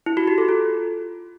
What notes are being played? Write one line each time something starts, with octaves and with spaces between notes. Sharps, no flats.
E4
F#4
G4
A4
F4